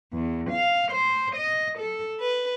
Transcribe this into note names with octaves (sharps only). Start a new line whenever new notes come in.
E2
F5
C5
D#5
A4
B4